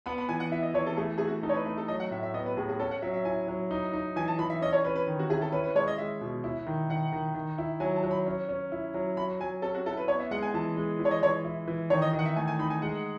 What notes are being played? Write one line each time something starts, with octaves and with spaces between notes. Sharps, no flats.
B3 B5
B5
E3 G#5
F#5
E4 E5
D#5
E3 C#5
A4
A3 G#4
A3 G#4
F#4
D#4 A4
C#5
B4
A3 B4
A4
F#3 D#5
F#5
A2 E5
E5
B3 D#5
B4
A2 G#4
G#4
C#4 A4
F#5
F#3 E5
E5
E4 G#5
F#3
D#4
D#4
E3 G#5
A5
E3 B5
E5
C#4 D#5
C#5
C#4 B4
B4
D#3
F#4
E4 G#4
A4
C#4 B4
B4
G#3 C#5
D#5
G#3 E5
B2
E4
D#3
D#3 F#5
D#3
D#3
E4
F#3 G#5
A5
F#3
B5
C#4
C#4
E4
F#3
F#3 B5
F#3 G#5
C#4 A4
F#4
E4 A4
B4
B3 C#5
E5
G#3 F#5
G#5
E3 A5
G#3
E3
C#5
D#5
E3 C#5
E4
E3
D#3 C#5
D#5
D#3
F#5
E5
A3 G#5
G#5
D#4 B5
G#5
G#3 F#5